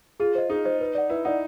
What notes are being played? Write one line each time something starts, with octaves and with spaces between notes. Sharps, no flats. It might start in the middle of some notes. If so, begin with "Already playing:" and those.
F4 G#4
C5 D#5
D#4 G#4
C5 D#5
B4
D5 F#5
E4 B4
D#4 D5 F#5